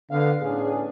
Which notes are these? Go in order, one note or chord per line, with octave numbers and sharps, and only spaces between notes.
D3 B3 F5
A2 B3 C#4 D4 G#4